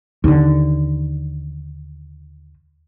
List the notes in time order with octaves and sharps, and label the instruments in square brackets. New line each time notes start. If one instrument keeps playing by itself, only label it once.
[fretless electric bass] D#2 D3